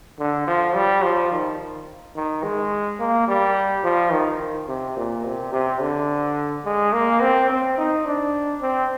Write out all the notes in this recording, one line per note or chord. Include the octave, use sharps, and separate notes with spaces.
D3
F3
G3
F3
D#3
D#3
G#3
A#3
G3
F3
D#3
C3
A#2
C3
C3
D3
G#3
A#3
C4
C4
D#4
D4
C4